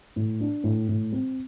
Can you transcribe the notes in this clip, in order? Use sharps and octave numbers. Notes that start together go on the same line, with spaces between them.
A2
D4
A2
A2
C4